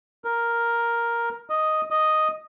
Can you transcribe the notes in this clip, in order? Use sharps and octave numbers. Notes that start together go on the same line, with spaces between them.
A#4
D#5
D#5